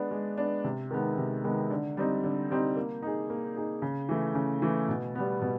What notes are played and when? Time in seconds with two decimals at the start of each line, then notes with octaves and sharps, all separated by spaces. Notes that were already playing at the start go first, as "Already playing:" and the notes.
Already playing: G#3 B3 D4
0.11 G#3
0.38 B3 D4
0.64 C3
0.91 D#3 G#3 B3
1.18 C3
1.44 D#3 G#3 B3
1.70 D3
1.97 G3 C4 D#4
2.24 D3
2.51 G3 C4 D#4
2.77 A#3
3.02 D#4 G#4
3.30 A#3
3.57 D#4 G#4
3.82 C#3
4.09 E3 A3
4.35 C#3
4.62 E3 A3
4.88 B2
5.15 G3 B3
5.41 B2